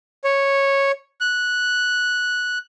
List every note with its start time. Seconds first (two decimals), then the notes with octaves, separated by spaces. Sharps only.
0.24 C#5
1.21 F#6